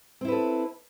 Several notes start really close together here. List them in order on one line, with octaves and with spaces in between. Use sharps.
C4 E4 B4 A4